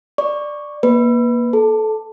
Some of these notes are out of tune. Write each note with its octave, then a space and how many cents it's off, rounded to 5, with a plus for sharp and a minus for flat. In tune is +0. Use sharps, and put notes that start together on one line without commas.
D5 +10 C#6 +0
A#3 +20 B4 +0
A4 -20 A5 +15